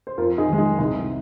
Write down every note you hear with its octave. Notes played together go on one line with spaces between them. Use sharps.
C5
F2 F4 A#4
D#4 G#4
D#3 G#3
D#4 G#4
C2 D#4